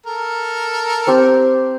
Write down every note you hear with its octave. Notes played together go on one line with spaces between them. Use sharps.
A4 A#4
C4 G4 C5